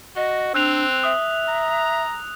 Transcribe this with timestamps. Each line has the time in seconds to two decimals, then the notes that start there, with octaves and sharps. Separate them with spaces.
0.16 F#4 D#5
0.54 C4 D4 E6 F#6 F7
1.04 E5 D#6
1.48 A#5